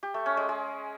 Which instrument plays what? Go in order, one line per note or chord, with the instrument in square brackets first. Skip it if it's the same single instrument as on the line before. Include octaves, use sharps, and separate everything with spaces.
[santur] G4
A3
C#4
G#3
G#3